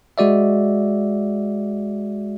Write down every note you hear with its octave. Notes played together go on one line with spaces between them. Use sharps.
G#3 F#4 D5 E5